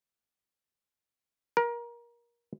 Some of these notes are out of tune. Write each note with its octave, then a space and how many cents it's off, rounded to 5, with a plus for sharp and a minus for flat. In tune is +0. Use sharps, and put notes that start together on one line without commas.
A#4 +25